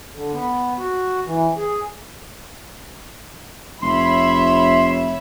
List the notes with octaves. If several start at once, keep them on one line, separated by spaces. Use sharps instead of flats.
D3
B3
F#4
E3
G#4
F1 C#5 E5 B5 C6